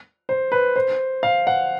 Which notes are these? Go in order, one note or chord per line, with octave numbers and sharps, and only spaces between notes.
C5
B4
C5
F5
F#5